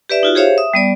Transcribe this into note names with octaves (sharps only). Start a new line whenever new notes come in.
G4 B4 D5 E5
D#4 F4 F#4
G4 G#4 C5 C#5 E5 F5
E5 D#6
G3 B3 D5